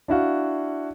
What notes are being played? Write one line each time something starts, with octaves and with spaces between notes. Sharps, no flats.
D4 E4 F#4 F5